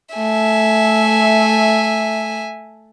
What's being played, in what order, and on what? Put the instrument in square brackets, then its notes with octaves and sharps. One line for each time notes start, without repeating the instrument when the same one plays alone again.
[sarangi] A3 [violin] E5 G#5